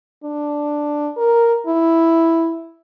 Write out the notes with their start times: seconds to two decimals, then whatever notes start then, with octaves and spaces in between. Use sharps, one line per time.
0.24 D4
1.17 A#4
1.67 E4